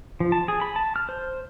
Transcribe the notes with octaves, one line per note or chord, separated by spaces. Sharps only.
F3
A5
G#4
B5
A5
F6
C5